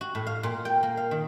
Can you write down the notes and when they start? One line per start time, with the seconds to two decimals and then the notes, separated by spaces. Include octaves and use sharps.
0.01 F#4
0.15 A2
0.27 F5
0.43 A#2
0.65 G5
0.83 A#3
0.97 F5
1.11 D#3